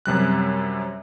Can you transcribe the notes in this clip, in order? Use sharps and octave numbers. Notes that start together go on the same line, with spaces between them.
F#2 C3 G3 F#6